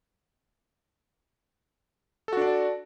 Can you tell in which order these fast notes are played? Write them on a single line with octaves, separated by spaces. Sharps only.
A4 F#4 D4 D5